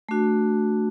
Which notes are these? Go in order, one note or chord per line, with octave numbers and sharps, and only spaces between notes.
A3 D4 F#4